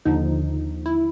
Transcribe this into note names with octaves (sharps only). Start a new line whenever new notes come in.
D#2 D3 F3 D#4
E4